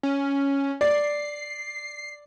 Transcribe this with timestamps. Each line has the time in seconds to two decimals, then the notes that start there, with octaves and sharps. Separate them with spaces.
0.03 C#4
0.81 D5 C7